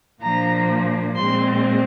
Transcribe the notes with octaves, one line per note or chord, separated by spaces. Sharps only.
A#2 F3 A#3 D4 A#5
A#2 G#3 C4 C6